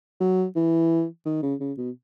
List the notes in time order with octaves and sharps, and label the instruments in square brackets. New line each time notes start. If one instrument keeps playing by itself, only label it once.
[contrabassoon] F#3
E3
D#3
C#3
C#3
B2